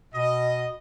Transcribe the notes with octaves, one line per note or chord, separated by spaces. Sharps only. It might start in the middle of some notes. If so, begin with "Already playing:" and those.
B2 D#5